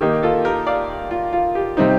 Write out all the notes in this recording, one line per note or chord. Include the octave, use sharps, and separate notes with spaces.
D#3 A#3 D#4 G4
F4 A4
G4 A#4
D5 F5
F4
F4
G4
C3 G3 C4 D#4